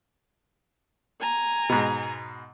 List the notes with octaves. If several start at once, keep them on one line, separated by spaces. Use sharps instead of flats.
G#5 A#5
G#2 B2